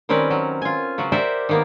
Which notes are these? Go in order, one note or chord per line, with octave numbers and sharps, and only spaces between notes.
D#3 G3 C4 C#4 A#4 B4
F#3
F4 G#5
C#3 F#3 F#4
G4 A#4 C5 D5 E5 F#5
D#3 A#3 B3